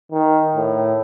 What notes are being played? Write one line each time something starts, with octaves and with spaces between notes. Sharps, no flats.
D#3
A2